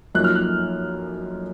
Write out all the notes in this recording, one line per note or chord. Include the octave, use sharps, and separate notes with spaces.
F#2 F3 A#3 D#4 F#6
F6
F#6